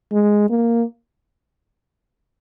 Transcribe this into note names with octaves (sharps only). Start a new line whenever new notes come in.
G#3
A#3